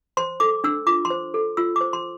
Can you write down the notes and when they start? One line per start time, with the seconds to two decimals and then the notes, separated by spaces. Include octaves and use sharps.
0.17 C5 C6
0.40 A4 D6
0.64 D4 E6
0.87 F4 D6
1.05 C6
1.10 C5
1.34 A4
1.57 F4 E6
1.76 C5 D6
1.93 C6